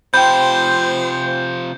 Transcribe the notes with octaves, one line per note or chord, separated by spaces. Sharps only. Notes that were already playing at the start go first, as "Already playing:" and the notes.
C3 F3 C5 G5 B5 G6